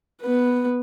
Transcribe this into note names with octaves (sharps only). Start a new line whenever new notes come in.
B3 B4